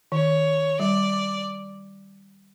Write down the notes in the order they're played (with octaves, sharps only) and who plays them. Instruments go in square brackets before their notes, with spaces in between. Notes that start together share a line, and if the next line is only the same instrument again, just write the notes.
[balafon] D#3 [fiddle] C#5
[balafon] G3 [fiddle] D5